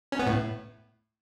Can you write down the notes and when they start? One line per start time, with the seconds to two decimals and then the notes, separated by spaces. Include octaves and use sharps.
0.12 C#4
0.19 B3
0.27 A2